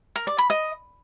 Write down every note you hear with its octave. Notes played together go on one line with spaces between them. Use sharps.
A#4
D5
B5
D#5